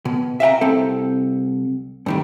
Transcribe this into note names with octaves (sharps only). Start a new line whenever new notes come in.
B2
E5 F5 G5 A#5
C2 C4 A4
G2 D#3 G3